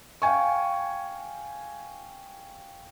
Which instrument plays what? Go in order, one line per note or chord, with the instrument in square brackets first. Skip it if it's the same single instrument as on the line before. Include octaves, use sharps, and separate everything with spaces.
[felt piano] F5 G5 G#5 C#6